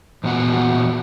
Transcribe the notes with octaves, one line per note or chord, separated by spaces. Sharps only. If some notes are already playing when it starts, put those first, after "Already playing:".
E2 A#2 B3 F#4 F#5